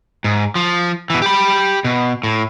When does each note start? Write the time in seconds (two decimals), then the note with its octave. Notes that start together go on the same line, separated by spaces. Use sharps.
0.24 G#2
0.55 F3
1.10 B2 E3
1.22 G4 B5
1.84 B2
2.23 A2